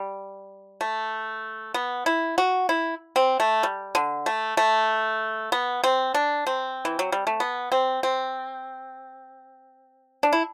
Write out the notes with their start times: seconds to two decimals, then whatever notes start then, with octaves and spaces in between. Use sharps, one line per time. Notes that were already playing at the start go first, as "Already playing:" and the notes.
Already playing: G3
0.81 A3
1.74 B3
2.06 E4
2.38 F#4
2.69 E4
3.16 C4
3.40 A3
3.63 G3
3.95 D3
4.26 A3
4.57 A3
5.52 B3
5.84 C4
6.14 D4
6.47 C4
6.85 E3
6.99 F#3
7.12 G3
7.27 A3
7.40 B3
7.72 C4
8.03 C4
10.23 D4
10.33 E4